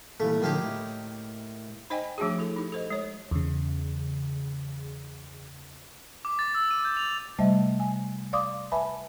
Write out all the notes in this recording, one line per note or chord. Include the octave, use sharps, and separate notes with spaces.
A#2 E3 G3 A3
A2 D3 D#3 F3 A#3 G4
A2
D#4 C5 D#5 G5 G#5
F3 A3 D4 F#4 G#4
E4 A4
D#4 G4
A4 C5 D#5
G#3 C#5
E2 C#3
D6
A6
E6
D#7
G6
F7
C3 G3 A3 D#5 E5
G#5
D5 F5 C6 D6 D#6
B4 E5 G#5 A5 B5